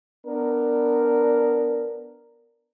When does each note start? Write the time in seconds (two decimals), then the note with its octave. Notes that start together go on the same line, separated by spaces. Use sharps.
0.26 B3 D4 A#4